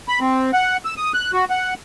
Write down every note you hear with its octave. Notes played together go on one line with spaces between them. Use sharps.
B5
C4
F#5
E6
D#6
F#6
F#4
F#5